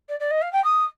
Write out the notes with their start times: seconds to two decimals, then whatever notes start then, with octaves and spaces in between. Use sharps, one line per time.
0.08 D5
0.19 D5
0.30 D#5
0.41 F5
0.52 G5
0.64 D#6